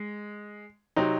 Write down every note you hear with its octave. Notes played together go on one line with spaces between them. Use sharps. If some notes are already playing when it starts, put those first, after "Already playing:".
Already playing: G#3
C3 F#3 C4 D#4